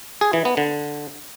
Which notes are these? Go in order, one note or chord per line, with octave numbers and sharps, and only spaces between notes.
G#4
E3
B3
D3